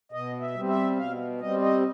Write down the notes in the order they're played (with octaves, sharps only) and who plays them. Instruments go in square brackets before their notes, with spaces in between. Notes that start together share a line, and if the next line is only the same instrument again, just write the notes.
[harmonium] B2 D#5
E5
G3 C4
E5
B2 F5
G3 C4 D#5
D#5